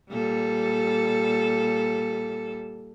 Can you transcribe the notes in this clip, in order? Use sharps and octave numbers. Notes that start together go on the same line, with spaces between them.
A#2 G3 A4